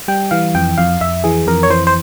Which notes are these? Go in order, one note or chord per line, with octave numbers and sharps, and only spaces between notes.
G3 G5
E3 F5
F2 G5
F2 F5
F2 E5
E3 G#4
F2 A#4
C#5
E3 C5
C5